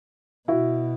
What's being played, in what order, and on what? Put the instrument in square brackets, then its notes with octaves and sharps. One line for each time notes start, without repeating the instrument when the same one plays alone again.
[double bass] B2 [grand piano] E4 F#4